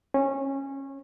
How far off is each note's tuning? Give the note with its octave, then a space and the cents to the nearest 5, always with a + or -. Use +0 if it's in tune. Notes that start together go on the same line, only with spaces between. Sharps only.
C#4 -20